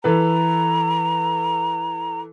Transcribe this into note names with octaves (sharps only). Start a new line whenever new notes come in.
E3 A4 B4 A#5